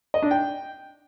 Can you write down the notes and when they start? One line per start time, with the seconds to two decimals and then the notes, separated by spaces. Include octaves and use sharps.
0.14 D#5
0.22 D4
0.31 G5